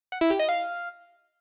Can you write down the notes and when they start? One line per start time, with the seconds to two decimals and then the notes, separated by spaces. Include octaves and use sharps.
0.12 F#5
0.21 E4
0.30 G4
0.39 D#5
0.49 F5